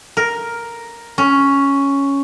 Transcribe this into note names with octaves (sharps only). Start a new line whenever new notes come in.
A#4
C#4